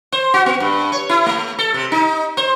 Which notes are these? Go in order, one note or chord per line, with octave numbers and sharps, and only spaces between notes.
C5
F#4
B3
G2
C#5
E4
A3
A4
C3
D#4
C5